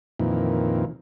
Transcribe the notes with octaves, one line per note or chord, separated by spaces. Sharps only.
F2 A#2 D#3 E3